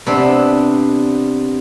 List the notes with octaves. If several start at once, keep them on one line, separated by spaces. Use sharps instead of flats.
C3 B3 D4